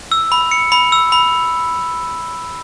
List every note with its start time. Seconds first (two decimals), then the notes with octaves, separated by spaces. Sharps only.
0.12 E6
0.32 B5
0.51 C#7
0.72 B5
0.92 E6
1.12 B5